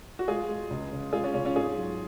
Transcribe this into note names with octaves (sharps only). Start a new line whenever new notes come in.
F#4
G#3 F4 G#4
G#3
C#2
C#3
G#3 F4 G#4
C#4 F4
C#3 C#4
C#4 F4
G#2 F4 G#4
F#3